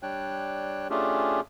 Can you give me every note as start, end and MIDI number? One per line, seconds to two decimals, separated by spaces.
0.03 0.87 55
0.03 0.87 62
0.03 0.87 73
0.03 0.87 79
0.03 0.87 90
0.90 1.40 57
0.90 1.40 61
0.90 1.40 62
0.90 1.40 65
0.90 1.40 67
0.90 1.40 68